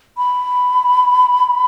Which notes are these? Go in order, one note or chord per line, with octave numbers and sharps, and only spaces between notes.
B5